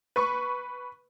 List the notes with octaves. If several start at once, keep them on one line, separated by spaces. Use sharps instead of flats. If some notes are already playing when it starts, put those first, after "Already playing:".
B4 C#6